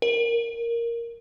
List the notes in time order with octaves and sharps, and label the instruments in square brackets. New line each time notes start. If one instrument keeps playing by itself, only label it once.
[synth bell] A#4